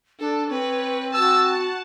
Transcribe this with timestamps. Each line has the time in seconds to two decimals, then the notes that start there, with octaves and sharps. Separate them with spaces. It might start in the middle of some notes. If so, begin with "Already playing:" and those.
0.20 D4 A4
0.50 C4 B4 C#5
1.14 F#4 A5 E6
1.53 F#5